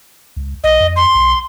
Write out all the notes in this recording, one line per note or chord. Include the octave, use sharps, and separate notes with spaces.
C#2
B1 D#5
F2
C6
B1